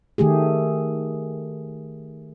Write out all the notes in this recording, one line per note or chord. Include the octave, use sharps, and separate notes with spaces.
D#3 A3 G4 G#4